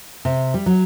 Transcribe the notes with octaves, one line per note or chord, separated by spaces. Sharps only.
C3
G3
F#3